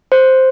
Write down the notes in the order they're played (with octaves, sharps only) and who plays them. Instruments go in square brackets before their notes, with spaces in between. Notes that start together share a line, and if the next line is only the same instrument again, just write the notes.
[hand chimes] C5